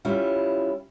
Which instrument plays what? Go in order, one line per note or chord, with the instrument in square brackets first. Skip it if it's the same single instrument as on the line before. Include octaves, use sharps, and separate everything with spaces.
[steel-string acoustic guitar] G3 C#4 E4 F4